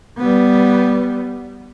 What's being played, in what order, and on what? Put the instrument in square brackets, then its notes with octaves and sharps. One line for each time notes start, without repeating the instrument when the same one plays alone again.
[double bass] G3 B3